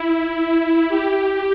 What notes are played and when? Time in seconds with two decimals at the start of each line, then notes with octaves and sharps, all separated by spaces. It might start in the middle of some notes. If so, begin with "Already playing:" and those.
Already playing: E4
0.89 G4